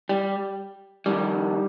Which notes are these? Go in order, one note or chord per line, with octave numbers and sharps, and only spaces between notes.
G3
F2 D#3 G3